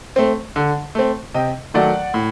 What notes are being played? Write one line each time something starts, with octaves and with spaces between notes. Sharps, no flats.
A3 C4
D3
A3 C4
C3 D#5 G5
D#3 F#3 A3 D5 F#5
A2